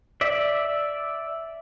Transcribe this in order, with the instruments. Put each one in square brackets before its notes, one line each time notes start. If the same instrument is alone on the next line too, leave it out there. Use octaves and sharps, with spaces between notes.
[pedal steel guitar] D5 E5